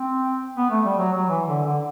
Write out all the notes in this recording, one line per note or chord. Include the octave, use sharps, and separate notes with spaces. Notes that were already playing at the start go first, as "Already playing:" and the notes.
Already playing: C4
B3
A3
G3
F#3
F#3
E3
D3
D3